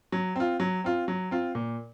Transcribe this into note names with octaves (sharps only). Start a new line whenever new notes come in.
F#3
C4 F4
F#3
C4 F4
F#3
C4 F4
A#2